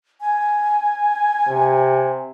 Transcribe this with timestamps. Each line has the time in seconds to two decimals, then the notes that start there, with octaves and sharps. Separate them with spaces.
0.21 G#5
1.48 C3